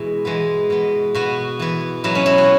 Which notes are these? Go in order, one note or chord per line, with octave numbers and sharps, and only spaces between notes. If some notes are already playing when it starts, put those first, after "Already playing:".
Already playing: B2 E3 G#3 E4
E3 G#3 B3
B2 B3
B2 B3 F#4
E3 B3
B2 F#3 B3 E4
C#4
E4
F#4